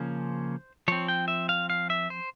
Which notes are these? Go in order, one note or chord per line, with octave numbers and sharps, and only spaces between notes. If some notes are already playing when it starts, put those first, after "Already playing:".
Already playing: C#3 F3 A#3 C#4 C5
F3 C4 C#5
G5
E5
F5
F5
E5
C5